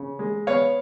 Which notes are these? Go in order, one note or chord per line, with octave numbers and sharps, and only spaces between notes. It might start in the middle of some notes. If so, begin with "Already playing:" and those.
Already playing: C#3
G#3
B3 C#5 F5